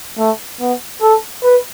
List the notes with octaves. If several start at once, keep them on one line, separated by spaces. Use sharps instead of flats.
A3
B3
A4
B4